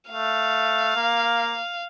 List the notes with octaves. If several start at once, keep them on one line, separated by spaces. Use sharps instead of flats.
A3 F5
A#3